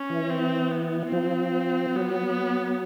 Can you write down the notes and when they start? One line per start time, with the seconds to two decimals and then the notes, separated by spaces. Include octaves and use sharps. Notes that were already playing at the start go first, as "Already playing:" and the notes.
Already playing: C#4
0.10 E3
0.30 C4
0.71 B3
1.12 F3 C4
1.95 F#3 B3